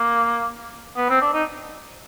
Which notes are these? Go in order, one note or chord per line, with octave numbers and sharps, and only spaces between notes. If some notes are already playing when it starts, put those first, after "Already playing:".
Already playing: A#3
B3
C4
D4
D#4